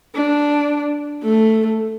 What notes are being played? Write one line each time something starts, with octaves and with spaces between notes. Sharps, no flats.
D4
A3